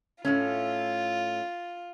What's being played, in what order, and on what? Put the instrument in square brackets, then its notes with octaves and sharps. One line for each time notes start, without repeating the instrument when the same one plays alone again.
[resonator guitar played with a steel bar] A2 A3 C#4 [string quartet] F4